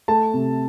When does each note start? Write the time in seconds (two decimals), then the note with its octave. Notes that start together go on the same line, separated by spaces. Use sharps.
0.08 A3 A5
0.34 C3